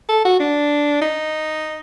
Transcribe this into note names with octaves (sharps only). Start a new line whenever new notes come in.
A4
F#4
D4
D#4